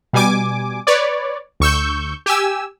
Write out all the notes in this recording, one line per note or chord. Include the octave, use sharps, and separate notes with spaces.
B2 G3 G#5 D6
B4 C#5 D5
D2 C#6 E6 G6
G4 G#5 E6